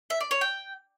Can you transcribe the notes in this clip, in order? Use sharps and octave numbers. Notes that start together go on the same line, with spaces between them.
E5
D5
C#5
G5